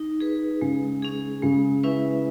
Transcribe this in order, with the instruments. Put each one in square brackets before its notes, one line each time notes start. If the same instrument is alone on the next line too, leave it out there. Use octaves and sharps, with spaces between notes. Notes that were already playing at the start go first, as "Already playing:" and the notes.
Already playing: [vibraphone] D#4
G#4 B4
[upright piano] C#3 [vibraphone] G#3
[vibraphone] C#4 G#4
[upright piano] C#3 [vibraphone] G#3
[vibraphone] C#4 E4 B4 E5